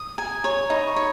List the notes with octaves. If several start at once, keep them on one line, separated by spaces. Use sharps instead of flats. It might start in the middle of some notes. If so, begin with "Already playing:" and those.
Already playing: D#6
G#5 A#5
A#5
C#5 A#5
D#4 B5
B5
C#6
C#5